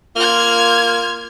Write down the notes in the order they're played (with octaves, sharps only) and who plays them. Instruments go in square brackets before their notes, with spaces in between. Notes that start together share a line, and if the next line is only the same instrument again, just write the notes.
[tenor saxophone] A#3 [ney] F4 [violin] F6 G#6